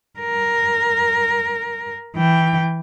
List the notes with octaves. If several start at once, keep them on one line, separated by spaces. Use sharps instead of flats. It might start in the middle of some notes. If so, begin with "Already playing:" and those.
A#4
E3 G5